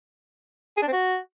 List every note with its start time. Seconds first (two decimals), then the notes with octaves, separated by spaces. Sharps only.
0.77 G#4
0.82 D4
0.88 C4
0.93 F#4